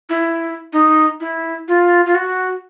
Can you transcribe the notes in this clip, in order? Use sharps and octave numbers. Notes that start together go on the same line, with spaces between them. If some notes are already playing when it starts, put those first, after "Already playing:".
E4
D#4
E4
F4
F4
F#4